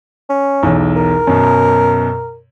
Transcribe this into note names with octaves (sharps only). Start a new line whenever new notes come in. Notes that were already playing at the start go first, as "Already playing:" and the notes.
C#4
B1 E2
A#4
F#2 B2